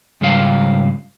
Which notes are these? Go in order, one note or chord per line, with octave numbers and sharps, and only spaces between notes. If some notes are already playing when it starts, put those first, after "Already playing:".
G#2 C#3 G3 F4 F5